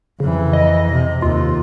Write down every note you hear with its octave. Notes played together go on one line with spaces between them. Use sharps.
F2 C#3 E3
D#5
C3
D#2 F4